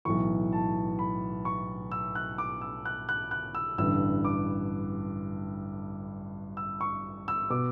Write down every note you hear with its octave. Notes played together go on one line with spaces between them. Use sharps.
B1 A2 E3 C#6
A5
B5
C#6
E6
F#6
D6
E6
F#6
F#6
F#6
E6
A1 G2 D3 E6
D6
E6
C#6
E6
B2 D6